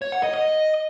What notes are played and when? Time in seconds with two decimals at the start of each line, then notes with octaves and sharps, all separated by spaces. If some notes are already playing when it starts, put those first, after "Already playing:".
0.02 C#5
0.12 F#5
0.23 D#5
0.34 D#5